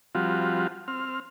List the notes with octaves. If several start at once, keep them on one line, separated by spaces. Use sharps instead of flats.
F3 G3 C4 F4 F#4
C4 F6